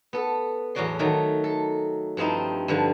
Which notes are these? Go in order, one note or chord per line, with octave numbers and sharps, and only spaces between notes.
B3 A4
E2 A2 F#3 F#4 D5 C6
D#3 F#3 A3
A4
G2 F3 C4 D#4 E4
G2 D3 F3